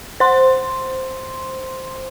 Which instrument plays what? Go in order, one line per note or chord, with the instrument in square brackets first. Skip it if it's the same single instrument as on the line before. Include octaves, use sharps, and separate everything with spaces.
[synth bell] C5 C6